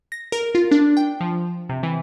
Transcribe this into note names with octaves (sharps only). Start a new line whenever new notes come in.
A#6
A#4
F4
D4
G5
F3
C3
E3